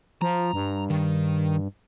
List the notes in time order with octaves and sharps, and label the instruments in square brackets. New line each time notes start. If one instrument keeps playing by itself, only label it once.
[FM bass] F3 [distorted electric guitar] A#5
[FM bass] G2
[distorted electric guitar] D#3